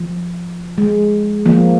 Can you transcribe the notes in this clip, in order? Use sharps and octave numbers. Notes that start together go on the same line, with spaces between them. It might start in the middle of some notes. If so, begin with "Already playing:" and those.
Already playing: F3
G#3
F3 A#3